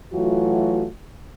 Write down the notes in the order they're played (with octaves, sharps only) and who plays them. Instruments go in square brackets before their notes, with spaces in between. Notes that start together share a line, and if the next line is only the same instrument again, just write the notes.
[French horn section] E3 F#3 A3 F4 F#4